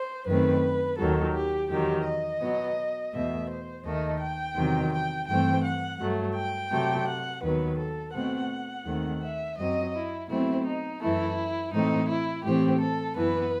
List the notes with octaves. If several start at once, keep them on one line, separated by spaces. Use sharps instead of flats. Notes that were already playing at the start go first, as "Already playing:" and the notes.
Already playing: C5
F#2 D#3 A3 C4 B4
D#2 D#3 F#3 A4
G4
E2 D#3 F#3 G4
D#5
B2 F#3 B3
E2 B2 A3 E5
C5
D#2 D#3 A3 D#5
G5
E2 C3 D#3 F#3 C4
G5
G2 E3 A3 C4 G5
F#5
G2 F#3 A3
G5
C3 F#3 A3
F#5
D#2 D#3 F#3 B3 B4
A4
B2 A3 C4 F#5
D#2 D#3 A3 C4
E5
F#2 F#3 C4 D#5
E4
B2 F#3 A3 C4 E4
D#4
F#2 E3 A3 E4
A2 E3 A3 C4 D#4
E4
A2 E3 A3 C4 G4
A4
F#2 E3 B3 B4